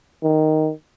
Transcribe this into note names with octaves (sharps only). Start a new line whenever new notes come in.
D#3